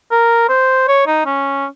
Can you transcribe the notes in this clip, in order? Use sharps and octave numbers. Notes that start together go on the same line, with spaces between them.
A#4
C5
C#5
D#4
C#4